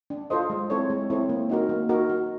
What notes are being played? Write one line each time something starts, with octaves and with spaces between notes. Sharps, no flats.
D4
F4 A4 C5 D#5
G#3
C4 E4 A4 C#5
G#3
C4 E4 A4 C#5
A#3
D#4 F#4 A#4
A#3
D#4 F#4 A#4
F#4